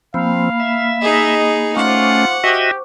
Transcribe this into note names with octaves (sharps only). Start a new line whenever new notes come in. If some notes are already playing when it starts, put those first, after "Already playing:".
F3 A#3 C4 F5 B5
E5
D#4 G#4 D#5
A3 C#4 F4 C5 F#5 C#6 D6
F#4 G4 D#5 E5